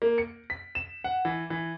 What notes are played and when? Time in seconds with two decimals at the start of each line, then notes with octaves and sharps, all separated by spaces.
0.02 A#3
0.18 C#7
0.50 B6
0.75 E7
1.04 F#5
1.25 E3
1.50 E3